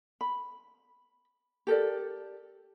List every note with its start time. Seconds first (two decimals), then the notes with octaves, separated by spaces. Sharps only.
0.21 B5
1.67 G4 A4 A#4 D5